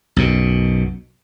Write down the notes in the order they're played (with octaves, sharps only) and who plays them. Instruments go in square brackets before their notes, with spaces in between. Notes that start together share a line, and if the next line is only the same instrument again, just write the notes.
[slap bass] B1 F#2 B2